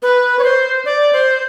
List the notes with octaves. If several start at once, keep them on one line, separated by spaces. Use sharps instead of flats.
B4
C#5
C5
D5
C5